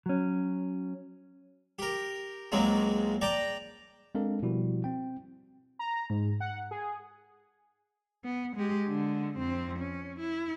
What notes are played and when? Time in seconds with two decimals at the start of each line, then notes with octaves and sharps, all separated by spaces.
0.06 F#3 C#4
1.79 G4 A#4
2.52 C#2 F#3 G#3 A#3 C4
3.21 D5 G5 A5 A#5 D6
4.15 G#3 C4 D4 A4 A#4 F5
4.42 B2 F3 G3 E4 F#4
4.84 C4 G5
5.79 A#5
6.10 G#2
6.40 F#5
6.71 G#4
8.25 B3
8.56 G#3 G4
8.87 D3 G#3
9.37 F2 C4
9.79 C#4
10.20 E4